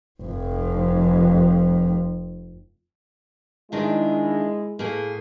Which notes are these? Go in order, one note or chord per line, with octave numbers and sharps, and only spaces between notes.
F1 F2
G#2 D#3 G#3 D4 E4
A2 A#3 G#4